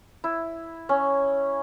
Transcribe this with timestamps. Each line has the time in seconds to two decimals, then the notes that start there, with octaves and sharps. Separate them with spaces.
0.24 E4
0.89 C#4